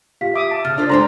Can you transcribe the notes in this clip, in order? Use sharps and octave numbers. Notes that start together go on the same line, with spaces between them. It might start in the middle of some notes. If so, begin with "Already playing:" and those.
F4 G4 F5 B6
E5 D6 D#6
A5
C#3 F6 A6
D4 F4 A4 C5
G2 G#3 C4 C5 A#5 C6